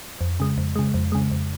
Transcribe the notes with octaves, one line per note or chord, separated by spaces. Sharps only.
F2
C#3 G#3
F2
C#3 G#3
F2
C#3 G#3
F2